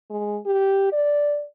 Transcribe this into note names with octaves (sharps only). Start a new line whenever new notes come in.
G#3
G4
D5